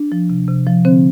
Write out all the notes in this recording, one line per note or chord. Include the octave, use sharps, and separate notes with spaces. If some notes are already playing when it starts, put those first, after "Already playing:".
Already playing: D4
F3
C3
C3
F3
D3 C4 C5